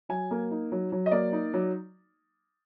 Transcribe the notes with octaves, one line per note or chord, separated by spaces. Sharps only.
F#3 G#5
A#3
D#4
F#3
F#3
D#5
A#3 D5
D#4
F#3